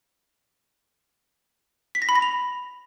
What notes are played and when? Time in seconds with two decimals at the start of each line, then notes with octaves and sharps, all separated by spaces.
1.95 B6
2.02 A#6
2.09 B5
2.15 A#6
2.22 F7